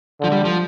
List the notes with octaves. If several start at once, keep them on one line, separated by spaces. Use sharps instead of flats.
D3 F3
G3
F3